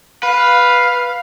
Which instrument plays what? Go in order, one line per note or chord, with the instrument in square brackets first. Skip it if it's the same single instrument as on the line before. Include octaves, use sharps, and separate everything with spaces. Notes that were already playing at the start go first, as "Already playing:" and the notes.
[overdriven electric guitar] B4 [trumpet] F5